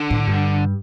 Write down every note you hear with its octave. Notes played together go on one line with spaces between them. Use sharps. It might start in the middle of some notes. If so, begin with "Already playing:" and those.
Already playing: D3
A2
G2